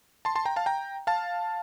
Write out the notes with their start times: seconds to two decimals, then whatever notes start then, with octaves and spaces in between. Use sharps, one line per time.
0.25 A5 C6
0.35 A5 C6
0.45 G5 A#5
0.56 F5 A5
0.66 G5 A#5
1.07 F5 A5